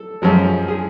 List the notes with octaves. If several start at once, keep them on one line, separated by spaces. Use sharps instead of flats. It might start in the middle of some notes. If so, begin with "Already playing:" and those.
Already playing: A4
F#2 F3 G#3
G#4